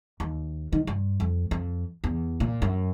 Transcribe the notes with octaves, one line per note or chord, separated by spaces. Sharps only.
D#2
D#3
G2
F2
F2
E2
A#2
F#2